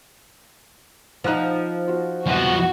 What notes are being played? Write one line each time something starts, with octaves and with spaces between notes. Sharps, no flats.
F3 D#4 F#5 F#6
F4 F#4
C2 F2 B2 F3 F#4 B4